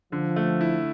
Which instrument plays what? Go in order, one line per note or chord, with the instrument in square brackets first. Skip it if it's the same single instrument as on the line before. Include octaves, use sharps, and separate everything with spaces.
[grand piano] D3 [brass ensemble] F3
[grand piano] A3
E4